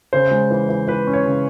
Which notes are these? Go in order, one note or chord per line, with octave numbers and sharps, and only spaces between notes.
C#3 C5
G#3
E3
E3
E3 B4
C#4
C#5
C#3